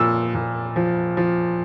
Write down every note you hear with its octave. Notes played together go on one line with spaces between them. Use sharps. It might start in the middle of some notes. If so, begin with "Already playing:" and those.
Already playing: A#2 F3 E6
A#2
F3
F3